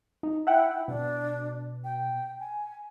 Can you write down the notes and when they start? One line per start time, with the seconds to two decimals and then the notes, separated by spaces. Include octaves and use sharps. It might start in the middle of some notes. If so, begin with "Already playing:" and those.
0.23 D#4
0.47 E4 E5 F#5 G5
0.88 B2 D4
1.84 G5
2.40 G#5